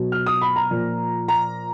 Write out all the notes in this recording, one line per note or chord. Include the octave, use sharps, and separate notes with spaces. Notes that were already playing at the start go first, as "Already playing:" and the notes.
Already playing: B2 F#3
F6
D#6
B5
A#5
A#2 F3
A#5